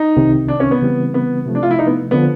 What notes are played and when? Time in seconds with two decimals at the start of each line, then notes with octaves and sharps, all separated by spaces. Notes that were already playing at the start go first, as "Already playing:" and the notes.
Already playing: D#4
0.16 C2 C3 D#3
0.48 D4
0.60 C#4
0.71 B3
0.82 C#3 E3 G3 C4
1.14 B3
1.46 C3 F3 A3
1.55 D4
1.63 F4
1.71 E4
1.79 D#4
1.87 B3
2.11 D3 F3 B3